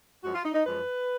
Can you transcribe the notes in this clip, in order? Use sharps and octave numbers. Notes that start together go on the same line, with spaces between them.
F#2 F3 G#3 F#4
F4
D#4
D#4
F#2 F3 G#3 B4